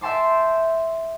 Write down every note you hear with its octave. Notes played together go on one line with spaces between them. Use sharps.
E5 G5 A5 C6 D6